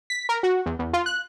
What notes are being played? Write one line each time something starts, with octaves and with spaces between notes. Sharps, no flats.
B6
A#4
F#4
E2
E2
F4
F#6